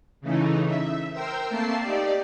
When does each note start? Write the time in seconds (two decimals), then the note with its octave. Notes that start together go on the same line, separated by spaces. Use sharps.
0.21 C#3 E3 A3 D#4
0.66 E5
1.13 A#4 C5 G5 E6
1.49 A3 A#3 C4 A5 C7
1.80 D#4 G4 D5